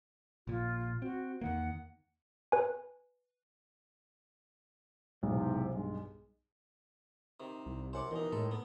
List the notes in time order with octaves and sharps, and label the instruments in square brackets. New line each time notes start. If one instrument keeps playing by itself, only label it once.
[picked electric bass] A#1 A#2 [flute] F4
[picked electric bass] C4 [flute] F#4
[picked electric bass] E2 D#3 A#3 [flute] F#5
[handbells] B4 G#5
[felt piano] B1 [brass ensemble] E2 G#2 C3
[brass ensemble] G2 G#3
[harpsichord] C3 D#3
[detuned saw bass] C2
[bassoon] F#2 [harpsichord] C5 F#5 D6
[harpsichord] B2 D#4 [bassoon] D#3 [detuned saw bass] E3
[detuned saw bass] A2 [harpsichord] G#3 A4
[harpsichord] B3